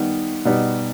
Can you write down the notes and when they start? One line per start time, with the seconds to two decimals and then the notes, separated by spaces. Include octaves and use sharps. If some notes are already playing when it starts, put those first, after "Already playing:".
Already playing: D#3 G3 B3
0.45 B2 G3 B3 D#4